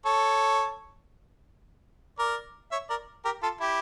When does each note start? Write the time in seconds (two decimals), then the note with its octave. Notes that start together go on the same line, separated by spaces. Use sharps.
0.06 A4 C#5
2.19 A#4 D5
2.72 C#5 E5
2.90 A#4 D5
3.25 G4 A#4
3.43 F4 A4
3.60 E4 G4